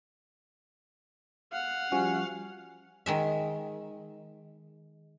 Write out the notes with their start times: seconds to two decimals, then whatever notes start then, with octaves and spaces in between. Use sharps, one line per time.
1.52 F5 F#5
1.92 F3 G3 C#4 F#4
3.06 D#3 G#3 E5